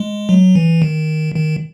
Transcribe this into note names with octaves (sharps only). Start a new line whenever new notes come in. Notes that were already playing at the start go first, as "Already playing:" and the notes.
Already playing: G#3
F#3
E3
D#3
D#3